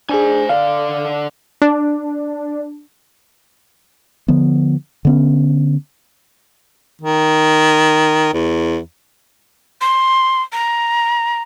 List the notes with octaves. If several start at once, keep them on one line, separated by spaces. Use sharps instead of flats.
D4 G#4 C5 G#5
D3 D5 F5
D4
D3 F3 B3
D3 B3 C#4
D#3
E2
C6
A#5